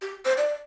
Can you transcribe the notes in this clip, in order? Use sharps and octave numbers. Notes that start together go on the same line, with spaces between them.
G4
C5
D5